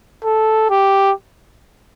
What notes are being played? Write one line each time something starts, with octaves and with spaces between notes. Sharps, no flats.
A4
G4